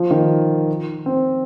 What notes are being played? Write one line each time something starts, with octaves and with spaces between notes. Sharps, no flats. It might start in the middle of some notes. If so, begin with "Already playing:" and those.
Already playing: F3
D#3
C4